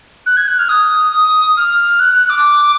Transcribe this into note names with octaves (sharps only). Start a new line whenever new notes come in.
F#6
G#6
F#6
F6
D#6
D#6
F6
F#6
F#6
D6